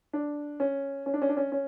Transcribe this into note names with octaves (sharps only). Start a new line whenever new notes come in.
D4
C#4
C#4
D4
C#4
D4
C#4
C#4